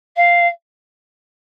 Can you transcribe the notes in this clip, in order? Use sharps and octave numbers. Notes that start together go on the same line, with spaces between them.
F5